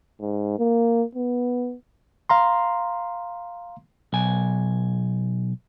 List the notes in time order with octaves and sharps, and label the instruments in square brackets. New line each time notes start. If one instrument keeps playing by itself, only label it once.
[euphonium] G#2
A#3
B3
[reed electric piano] F5 A#5 C6
[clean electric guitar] B1 G#5